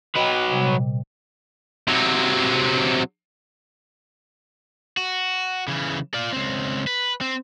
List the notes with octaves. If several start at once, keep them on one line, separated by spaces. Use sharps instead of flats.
F#3 B4 D#5 G5
C3 G3
A#2
C3 F#3
F#4
C#3 E3
F4 D5
C#2 C4
B4
C4